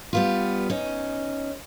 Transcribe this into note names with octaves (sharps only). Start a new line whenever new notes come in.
G3 B3 F4
C#4 D#4